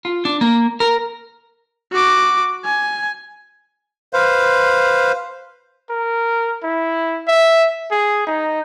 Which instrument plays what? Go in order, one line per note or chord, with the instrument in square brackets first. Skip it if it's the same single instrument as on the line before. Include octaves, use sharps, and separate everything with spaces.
[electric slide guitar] F4
D4
A#3
A#4
[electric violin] F#4 D6
G#5
[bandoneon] B4 C5 F5
[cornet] A#4
E4
E5
G#4
D#4